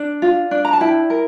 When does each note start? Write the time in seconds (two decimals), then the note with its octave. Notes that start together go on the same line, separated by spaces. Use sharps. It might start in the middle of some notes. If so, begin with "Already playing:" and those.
Already playing: D4
0.22 F4
0.51 D4
0.65 A#5
0.73 A5
0.81 E4 G5
1.10 A#4